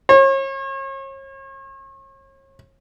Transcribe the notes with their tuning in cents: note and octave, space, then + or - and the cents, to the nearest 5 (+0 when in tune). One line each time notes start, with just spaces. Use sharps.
C#5 -40